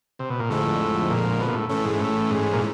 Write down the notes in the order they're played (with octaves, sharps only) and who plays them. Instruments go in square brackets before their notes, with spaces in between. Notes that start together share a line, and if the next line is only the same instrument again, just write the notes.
[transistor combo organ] C3
B2
A#2
[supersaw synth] F2 D3 F3 G#3 [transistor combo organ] A2
[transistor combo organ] A#2
B2
A#2
A2
[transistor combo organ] A2 [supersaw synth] E3 A3 C#4
[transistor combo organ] G#2
A2
G#2
A#2